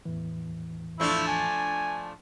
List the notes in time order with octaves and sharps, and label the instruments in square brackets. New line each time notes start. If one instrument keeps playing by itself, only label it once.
[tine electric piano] E2 A2 E3
[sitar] F3 A3 D4 [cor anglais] E4
[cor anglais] G#5